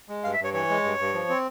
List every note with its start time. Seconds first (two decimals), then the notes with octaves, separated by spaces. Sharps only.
0.09 G#3
0.24 G2 F5
0.33 E5
0.39 G2 C#5
0.54 E3 C#5
0.70 G#3
0.84 G2
0.99 G2
1.14 F3
1.29 C4